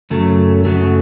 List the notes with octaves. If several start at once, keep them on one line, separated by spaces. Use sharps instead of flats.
F#2 C#3 F#3 A3
F#2 C#3 F#3 A3